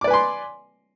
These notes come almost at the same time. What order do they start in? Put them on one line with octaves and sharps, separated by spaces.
D6 D5 B4 G#5 C6